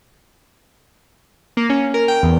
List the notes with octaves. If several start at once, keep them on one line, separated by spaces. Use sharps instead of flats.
A#3
C#4
A#4
G5
E2